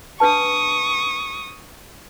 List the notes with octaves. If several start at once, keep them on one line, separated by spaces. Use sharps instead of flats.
D4 B4 A5 C#6 D#6